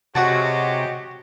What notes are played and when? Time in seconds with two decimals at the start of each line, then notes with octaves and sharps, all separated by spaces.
0.15 C3 F#3 G#3 F#4 G4 F#5 A5